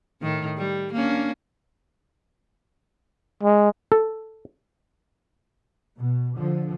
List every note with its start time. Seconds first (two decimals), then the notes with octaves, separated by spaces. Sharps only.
0.22 A2 D#3
0.58 G3
0.93 A#3 C#4 D4
3.43 G#3
3.92 A4
5.99 B2
6.35 D3 F3